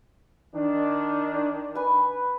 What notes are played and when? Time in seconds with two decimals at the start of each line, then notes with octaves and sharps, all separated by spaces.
0.55 D#3 D4
1.75 B4 G#5